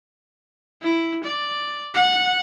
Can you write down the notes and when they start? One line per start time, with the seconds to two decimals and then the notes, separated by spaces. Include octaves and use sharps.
0.82 E4
1.24 D5
1.94 F#5